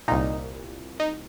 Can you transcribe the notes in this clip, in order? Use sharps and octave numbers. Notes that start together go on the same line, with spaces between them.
C2 A#2 D#4
D#4